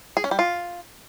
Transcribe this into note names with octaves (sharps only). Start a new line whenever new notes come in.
G#4
C#4
G3
F4